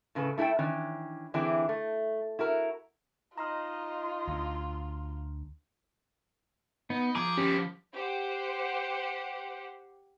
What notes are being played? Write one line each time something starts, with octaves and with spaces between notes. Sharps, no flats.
A2 C#3 A4 B4
A3 E4 G4 A4 G5
D#3 E3 C#4 D4
D3 E3 C4 D4 E4 G#4
A3
E4 F#4 A#4
D#4 F4 D#5 A#5 C6 F6
D2
B3 D#4
F3 G#4 A#5 D6
D#3 B3 C#4 G4
G4 C5 F#5